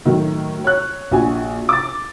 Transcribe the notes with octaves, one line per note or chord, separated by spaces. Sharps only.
A2 D#3 F#3
C#5 F#6
A#1 F#4 G#5
D6 A6